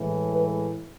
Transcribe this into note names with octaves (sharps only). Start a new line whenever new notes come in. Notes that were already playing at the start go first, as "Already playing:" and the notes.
Already playing: A2 E3 G#3
B4